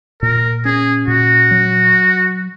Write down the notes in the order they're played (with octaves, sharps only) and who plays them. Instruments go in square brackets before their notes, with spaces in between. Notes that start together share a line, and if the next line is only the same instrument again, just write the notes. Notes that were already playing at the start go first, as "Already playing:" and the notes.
[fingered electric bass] A#2 [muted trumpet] A#4
[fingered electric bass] C#4 [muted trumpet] G#4
[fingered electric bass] A#2 [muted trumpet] F#4
[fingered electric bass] F#3